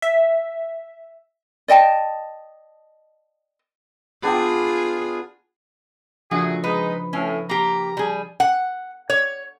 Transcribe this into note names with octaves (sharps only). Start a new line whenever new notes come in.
E5
D5 D#5 G5 A5
B3 D4 F4 G4 G#4
A#2 C#3 F3 A3 D4 F#4 G#4
G#3 D#4 B4
A2 C#4
A#3 G4 A#5
G3 G#4
F#5
C#5